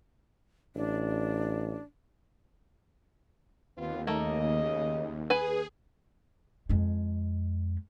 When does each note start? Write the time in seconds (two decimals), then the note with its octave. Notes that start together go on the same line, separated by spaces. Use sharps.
0.76 A1 D4
3.76 D#2 B3 C4 F4
4.07 C#3 A3 A#3 D#5
5.30 G#4 B4 G#5
6.69 F2 G#3